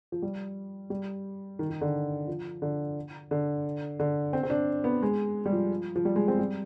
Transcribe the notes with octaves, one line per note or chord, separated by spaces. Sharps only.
F3
G3
G3
D#3
D#3
D3
F3
D3
D3
D3
C4
C4
D4
B3
G#3
G3
F3
F3
G3
G#3
C4
G3